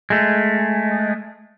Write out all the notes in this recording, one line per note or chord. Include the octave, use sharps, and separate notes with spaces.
G#3 A3